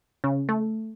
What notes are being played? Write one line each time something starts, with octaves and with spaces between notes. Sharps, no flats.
C#3
A3